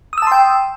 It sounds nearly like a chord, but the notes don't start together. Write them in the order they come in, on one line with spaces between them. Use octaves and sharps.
D#6 E6 A5 C6 G5